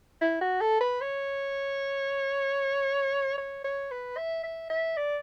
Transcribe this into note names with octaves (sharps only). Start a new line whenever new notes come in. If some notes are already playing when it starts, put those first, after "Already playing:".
E4
F#4
A4
B4
C#5
C#5
C#5
B4
E5
E5
E5
D5